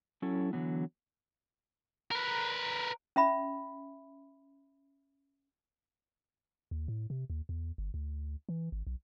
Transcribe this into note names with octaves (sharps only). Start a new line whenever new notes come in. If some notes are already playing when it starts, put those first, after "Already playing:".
F#3 C#4 E4 A4
D3 E3 F#3 B3
A#4 B4
C#4 E5 B5
D#2
A2
C3
D#2
E2
G1
D2
E3
G#1
B1